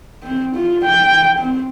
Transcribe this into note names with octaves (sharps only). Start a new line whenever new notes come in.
C4
F4
G5
C4